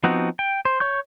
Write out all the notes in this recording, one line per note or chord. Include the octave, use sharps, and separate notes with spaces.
F3 B3 C4 D#4 F#4
G5
C5
C#5 C#6 G6